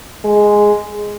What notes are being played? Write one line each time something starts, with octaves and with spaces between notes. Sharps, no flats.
G#3